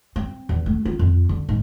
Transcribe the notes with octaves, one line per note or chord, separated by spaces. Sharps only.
C4
E2
A3
F4
F2
D3
G#2